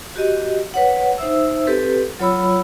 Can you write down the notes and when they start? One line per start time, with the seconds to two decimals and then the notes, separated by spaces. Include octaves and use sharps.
0.16 F#4 G4 D#5
0.74 B4 C#5 F#5
1.18 D#4 C5 E5 E6
1.67 C4 G4 A4 B4
2.19 F#3 F4 C#5 B5 E6